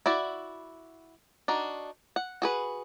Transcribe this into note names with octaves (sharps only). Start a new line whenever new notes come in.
E4 F#4 D5
D4 D#4 F#4
F#5
F#4 G#4 B4